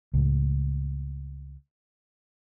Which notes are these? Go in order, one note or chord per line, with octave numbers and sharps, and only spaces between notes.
C#2 A2